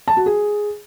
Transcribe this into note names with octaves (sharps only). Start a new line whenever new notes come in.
A5
F#4
G#4